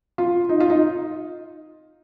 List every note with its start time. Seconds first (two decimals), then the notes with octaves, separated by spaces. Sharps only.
0.18 F4
0.49 D#4
0.60 F4
0.70 D#4